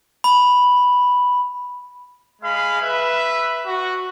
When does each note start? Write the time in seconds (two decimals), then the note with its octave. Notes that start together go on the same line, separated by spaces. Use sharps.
0.24 B5
2.42 G#3 G#4 F5 B5
2.80 B4 E5
3.66 F#4